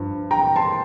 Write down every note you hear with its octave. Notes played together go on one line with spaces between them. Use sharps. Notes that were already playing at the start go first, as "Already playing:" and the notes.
Already playing: G2 F3
G5 A#5
A5 C6